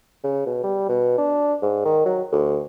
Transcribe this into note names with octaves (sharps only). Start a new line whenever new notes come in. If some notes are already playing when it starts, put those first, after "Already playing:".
C#3
B2
G3
B2
D4
G#2
D#3
F#3
D2